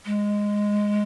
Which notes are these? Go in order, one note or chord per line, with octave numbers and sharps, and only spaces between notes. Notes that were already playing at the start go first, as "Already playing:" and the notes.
G#3